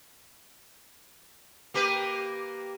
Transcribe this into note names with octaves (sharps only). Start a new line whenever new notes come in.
A#3 G4 B4